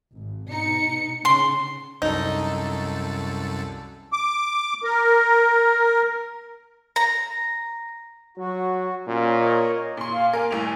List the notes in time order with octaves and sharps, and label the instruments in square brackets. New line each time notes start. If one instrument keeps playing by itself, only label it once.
[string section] G#1
B2 D#4 C#7
[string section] C#3 [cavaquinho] C6
[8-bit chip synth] C2 F#2 A4 [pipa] D#4
[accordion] D6
A#4
[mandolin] A#5
[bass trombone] F#3 [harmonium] F#4
[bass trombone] A#2 [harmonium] C#4
[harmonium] A#4 C#5 D#5
[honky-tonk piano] A#2 C6
[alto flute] F5
[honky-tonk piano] A#3 A#4 [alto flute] G#5
[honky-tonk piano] G1 A2 F7